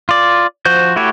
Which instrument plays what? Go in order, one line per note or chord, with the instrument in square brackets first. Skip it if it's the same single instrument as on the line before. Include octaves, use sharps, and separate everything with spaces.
[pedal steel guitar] F4 D5
F3 F#4 C5 G6
A3 E4 F#4 G4 C#5